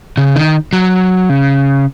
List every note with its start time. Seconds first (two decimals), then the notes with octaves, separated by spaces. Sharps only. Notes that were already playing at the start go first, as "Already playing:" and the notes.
0.17 C#3
0.36 D#3
0.73 F#3
1.29 C#3